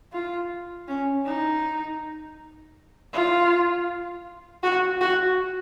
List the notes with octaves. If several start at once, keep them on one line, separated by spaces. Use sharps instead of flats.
F4
C#4
D#4
F4
F#4
F#4